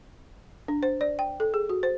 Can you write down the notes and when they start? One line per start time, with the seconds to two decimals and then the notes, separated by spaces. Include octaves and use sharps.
0.68 D4
0.83 C5
1.01 D5
1.19 G5
1.40 A4
1.54 G#4
1.69 F#4
1.83 C5